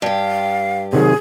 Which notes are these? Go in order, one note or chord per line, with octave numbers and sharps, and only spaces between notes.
G2 G4 F5
C3 D#3 F#3 G#4